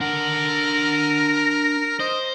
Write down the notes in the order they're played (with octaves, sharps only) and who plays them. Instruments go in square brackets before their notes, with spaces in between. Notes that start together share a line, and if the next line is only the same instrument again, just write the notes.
[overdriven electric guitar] D4 F#5 [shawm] A#4
[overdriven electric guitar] C5 [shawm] D#5